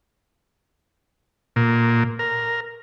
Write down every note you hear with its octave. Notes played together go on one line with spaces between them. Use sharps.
A#2
A#4